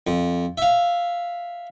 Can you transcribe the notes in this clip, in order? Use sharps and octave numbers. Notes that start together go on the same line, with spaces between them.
F2
E5 F5